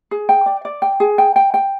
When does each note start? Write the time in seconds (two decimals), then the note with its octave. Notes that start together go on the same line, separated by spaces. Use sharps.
0.11 G#4
0.29 G5
0.46 D5
0.65 D5
0.82 G5
1.00 G#4
1.18 G5
1.36 G5
1.54 G5